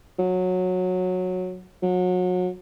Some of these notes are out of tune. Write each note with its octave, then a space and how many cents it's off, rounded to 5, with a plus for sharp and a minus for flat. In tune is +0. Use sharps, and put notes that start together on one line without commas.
F#3 -15
F#3 -30